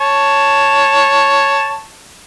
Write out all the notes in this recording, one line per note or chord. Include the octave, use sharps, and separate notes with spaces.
C#5 A5